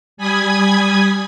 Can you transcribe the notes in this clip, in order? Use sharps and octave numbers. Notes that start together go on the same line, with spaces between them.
G3 G#5 B5 D#6 G#6